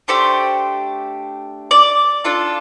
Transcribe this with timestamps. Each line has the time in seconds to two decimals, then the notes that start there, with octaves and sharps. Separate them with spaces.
0.08 A3 D4 G4 C5
1.71 D5
2.24 D4 F4 A4